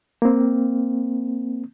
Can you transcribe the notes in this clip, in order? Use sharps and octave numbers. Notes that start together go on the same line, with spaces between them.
A#3 C4